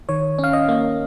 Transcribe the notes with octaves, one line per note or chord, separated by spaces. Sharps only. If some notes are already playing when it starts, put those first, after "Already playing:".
D#3 C#5
C#4
F5
D#5
A#3